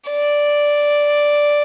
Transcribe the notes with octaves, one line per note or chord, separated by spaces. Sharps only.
D5